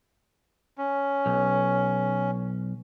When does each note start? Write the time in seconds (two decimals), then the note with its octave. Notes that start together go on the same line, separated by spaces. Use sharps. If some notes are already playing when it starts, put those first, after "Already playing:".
0.78 C#4
1.26 B1